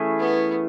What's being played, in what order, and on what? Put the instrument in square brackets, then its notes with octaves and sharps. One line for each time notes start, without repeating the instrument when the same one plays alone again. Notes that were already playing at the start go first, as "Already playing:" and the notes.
Already playing: [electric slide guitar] E3 A3 C#4 E4 G#4
[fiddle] B3